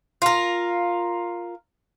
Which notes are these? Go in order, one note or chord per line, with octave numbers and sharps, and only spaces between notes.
F4 A#4